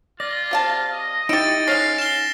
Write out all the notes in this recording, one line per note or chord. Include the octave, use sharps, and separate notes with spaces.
F4 D5 A#6
C3 F5 A5
D#5
D#4 E4 G4 A6 D7
G#3 C#4 F5 A#6 C7
E7 G7